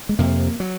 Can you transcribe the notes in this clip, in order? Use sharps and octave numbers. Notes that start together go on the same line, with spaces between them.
G#3
F2 C3 A#3
F#3